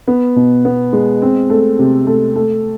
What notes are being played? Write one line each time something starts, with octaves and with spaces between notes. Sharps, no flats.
B3
B2
B3
G#3
C4
A3
C3
A3
A3